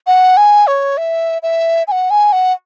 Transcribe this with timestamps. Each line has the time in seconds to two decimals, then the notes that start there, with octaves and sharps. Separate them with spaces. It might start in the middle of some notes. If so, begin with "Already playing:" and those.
0.07 F#5
0.37 G#5
0.67 C#5
0.97 E5
1.43 E5
1.88 G#5
1.92 F#5
2.10 G#5
2.32 F#5